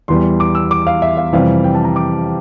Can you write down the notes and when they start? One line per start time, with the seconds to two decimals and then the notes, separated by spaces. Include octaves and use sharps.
0.08 E2 E3 G3 C6
0.40 D6
0.55 E6
0.71 D6
0.87 F5
1.02 E5
1.17 F5
1.33 F2 C3 E3 G3 F5
1.64 G5
1.75 A5
1.84 A#5
1.96 D6